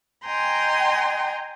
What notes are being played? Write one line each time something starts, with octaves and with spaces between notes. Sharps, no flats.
D#5 G5 G#5 A#5 C6